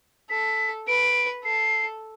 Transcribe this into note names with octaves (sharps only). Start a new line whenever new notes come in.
A4 B6
B4 D7
A4 C7